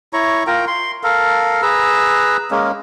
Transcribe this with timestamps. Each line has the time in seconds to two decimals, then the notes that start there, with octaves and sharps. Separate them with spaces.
0.13 E4 C#5 A#5 C#6
0.47 F4 A#4 G5 A#5
0.67 C6
1.03 A4 A#4 F5
1.62 G#4 B4 A#5 E6
2.51 G#3 A#3 C#4